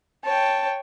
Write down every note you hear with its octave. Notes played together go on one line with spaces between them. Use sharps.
C#5 G5 A5